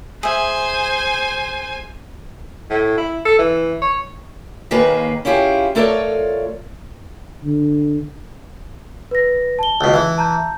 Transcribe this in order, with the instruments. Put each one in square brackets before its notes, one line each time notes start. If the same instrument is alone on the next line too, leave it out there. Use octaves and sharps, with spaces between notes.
[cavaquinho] G#4 E5 [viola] C5 G#5
[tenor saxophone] A2
E4
A4
E3
C#5
[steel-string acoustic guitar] D#2 D#3 A#3 G#4 B4
C#4 E4 F4 G4 G#4
A3 F4 A4 A#4 C#5 D5
[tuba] D3
[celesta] B4 A#6
A5 G7
[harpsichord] C#2 B2
E3
[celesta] A5 A#5 G6